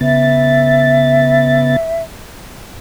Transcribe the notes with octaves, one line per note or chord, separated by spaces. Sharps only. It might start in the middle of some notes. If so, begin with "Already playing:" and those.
C#3 B3 E5 A6